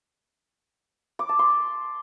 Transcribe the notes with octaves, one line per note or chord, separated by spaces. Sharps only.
D6
A5
C6